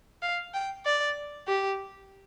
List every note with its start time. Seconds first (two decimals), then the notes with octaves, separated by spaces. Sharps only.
0.22 F5
0.54 G5
0.85 D5
1.47 G4